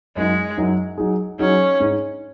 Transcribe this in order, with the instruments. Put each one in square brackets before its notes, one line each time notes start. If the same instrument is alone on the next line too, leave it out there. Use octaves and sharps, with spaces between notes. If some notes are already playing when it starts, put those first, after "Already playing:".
[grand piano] F#2 F#3 D#4 [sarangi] G#3
[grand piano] F#2 F#3 D#4
F#3 D#4 G#4
[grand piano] F#3 D#4 G#4 [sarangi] C#4
[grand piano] G#2 G#3 D#4